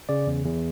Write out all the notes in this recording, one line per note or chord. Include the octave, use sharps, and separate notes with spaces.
C#3 D5
E2
E2